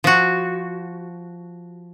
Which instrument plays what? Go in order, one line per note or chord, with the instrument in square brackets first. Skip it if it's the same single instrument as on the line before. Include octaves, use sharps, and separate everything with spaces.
[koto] F3 F#4